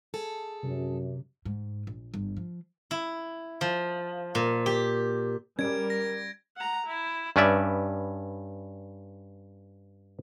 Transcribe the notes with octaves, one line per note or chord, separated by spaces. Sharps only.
G#4 A4
F#2 C3
G#2
A#1
G1
F3
E4
F3
A#2
G4
G3 C#4 A#4 G#6 D7
A#6
F#5 A#5
E4
G2 C#4 B4 D5 E5